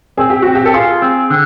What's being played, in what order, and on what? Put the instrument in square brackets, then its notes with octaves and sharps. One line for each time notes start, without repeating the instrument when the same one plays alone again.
[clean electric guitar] C4 [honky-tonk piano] G#4
[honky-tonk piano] G4
[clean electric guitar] C4 [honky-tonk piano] F#4
[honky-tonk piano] G4
A4
[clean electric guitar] F4 [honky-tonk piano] G#4
[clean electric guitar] C4
D3